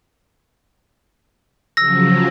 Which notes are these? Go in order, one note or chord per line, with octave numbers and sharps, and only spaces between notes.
C#3 F3 F#3 E6 A#6